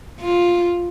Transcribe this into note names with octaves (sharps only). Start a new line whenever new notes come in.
F4